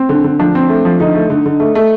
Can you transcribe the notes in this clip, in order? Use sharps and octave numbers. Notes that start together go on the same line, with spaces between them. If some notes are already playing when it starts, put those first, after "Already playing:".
Already playing: C4
D3
D3
F3 D4
C4
A3
F3
D3 D#4
A3
D3
D3
A3
A3